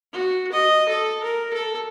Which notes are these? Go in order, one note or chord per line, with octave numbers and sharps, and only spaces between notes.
F#4
D#5
A4
A#4
A4